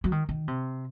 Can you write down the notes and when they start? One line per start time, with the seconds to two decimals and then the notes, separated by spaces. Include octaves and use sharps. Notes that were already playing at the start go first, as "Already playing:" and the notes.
0.04 F#3
0.12 D#3
0.29 D#3
0.48 C3